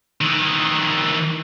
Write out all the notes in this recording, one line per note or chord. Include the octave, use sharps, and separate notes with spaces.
D#3 E3